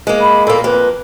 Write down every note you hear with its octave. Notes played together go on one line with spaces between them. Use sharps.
G#3 A#3
B5
A#2 A#3 A4
F2 A#3 B4